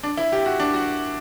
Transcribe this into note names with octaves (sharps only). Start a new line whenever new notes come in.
D4
E4
G4
F#4
D4
F#4